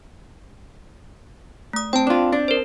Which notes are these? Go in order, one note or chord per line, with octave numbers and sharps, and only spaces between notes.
A3 D#6
C4 G5 A5
D4 F4
D4
A#4 C5